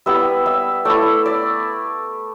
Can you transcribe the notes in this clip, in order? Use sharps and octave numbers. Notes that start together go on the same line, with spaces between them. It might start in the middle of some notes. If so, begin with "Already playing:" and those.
G3 B3 E4 E5
E5
A3 E4 D5
D5